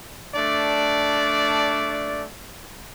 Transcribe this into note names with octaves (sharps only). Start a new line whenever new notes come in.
A3 D4 D5